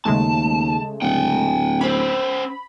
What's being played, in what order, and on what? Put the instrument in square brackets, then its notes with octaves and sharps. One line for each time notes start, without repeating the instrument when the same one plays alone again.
[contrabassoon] D#2 [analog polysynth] C#3 G#3 A3 [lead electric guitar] A5
[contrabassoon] D1 [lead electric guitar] F#5 G5
[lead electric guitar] C#4 C5 [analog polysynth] B5